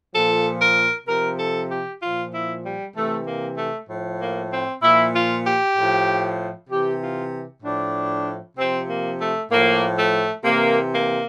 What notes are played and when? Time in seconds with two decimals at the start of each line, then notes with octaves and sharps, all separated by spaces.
0.13 A#2 F3 A4
0.61 A#4
1.07 C3 F3 A#4
1.39 A4
1.70 G4
2.01 A#2 F3 F4
2.33 E4
2.64 G3
2.95 C3 E3 A3
3.26 A#3
3.57 A3
3.89 A2 F3
4.20 A#3
4.52 C4
4.82 A#2 F3 E4
5.14 F4
5.45 G4
5.76 A2 F3
6.70 C3 E3 G4
7.01 F4
7.63 A2 F3 D4
8.58 C3 F3 C4
8.89 A#3
9.19 A3
9.51 A2 F3 A#3
9.98 A3
10.44 C3 E3 A#3
10.92 A#3